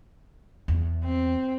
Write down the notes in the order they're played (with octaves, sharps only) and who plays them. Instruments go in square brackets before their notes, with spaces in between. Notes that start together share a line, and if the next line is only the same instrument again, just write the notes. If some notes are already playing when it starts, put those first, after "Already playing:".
[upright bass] E2
[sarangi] C4